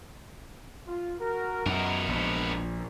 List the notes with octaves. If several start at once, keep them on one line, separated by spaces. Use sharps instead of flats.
F4
F#4 A#4
C#2 F#2 B2 B3 A#4
A#1 B2 E3 G#3